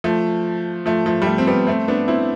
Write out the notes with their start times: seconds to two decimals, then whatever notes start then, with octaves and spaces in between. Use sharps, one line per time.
0.04 F3 A3
0.86 F3 A3
1.06 F3 A3
1.22 G3
1.26 F3 A3
1.38 C4
1.47 G3 B3
1.67 A3 C4
1.88 B3 D4
2.08 C4 E4